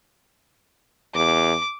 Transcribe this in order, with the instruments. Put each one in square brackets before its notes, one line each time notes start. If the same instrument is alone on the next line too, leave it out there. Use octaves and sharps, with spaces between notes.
[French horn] E2 [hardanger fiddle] D6